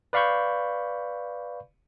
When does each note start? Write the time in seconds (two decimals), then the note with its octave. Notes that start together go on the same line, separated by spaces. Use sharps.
0.13 B4 D5 F5 B5 C#6 G6